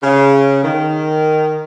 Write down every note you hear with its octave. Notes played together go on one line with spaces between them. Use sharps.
C#3
D#3